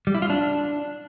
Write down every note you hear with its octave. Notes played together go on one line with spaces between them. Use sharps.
G3
E4
F4
D4